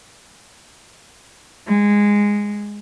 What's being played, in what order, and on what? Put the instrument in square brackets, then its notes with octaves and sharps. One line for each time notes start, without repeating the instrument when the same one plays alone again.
[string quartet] G#3